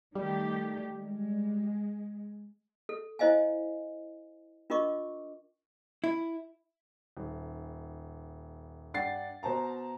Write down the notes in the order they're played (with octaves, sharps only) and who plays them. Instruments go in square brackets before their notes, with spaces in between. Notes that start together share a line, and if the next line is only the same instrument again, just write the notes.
[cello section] D#3 A3 G4 [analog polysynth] G3
[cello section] G#3
[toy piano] A4
E4 C5 D#5 F5 G#5
D4 F4 A#4 D#5 C#6 D6
[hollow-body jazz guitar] E4
[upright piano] D#1
G2 D4 F#5 G5 A6 C7
B2 C5 A5 A#5